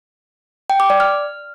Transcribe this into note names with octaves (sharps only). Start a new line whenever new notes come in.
G5
D6
D5
F6